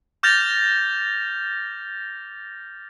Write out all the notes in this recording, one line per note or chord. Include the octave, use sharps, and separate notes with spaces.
D6 F6 G6 A6 A#6 F7